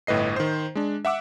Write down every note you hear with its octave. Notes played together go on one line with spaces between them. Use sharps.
G1 A2 B4 D#5 C7
D#3 C5
G#3 D4
E5 F#5 D6 E6